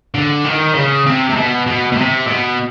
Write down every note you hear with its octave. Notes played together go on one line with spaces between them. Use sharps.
D3
D#3
C#3
C3
C3
B2
B2
B2
C3
B2